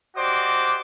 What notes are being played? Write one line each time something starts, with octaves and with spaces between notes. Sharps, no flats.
F#4 G4 C5 D5 D#5 D6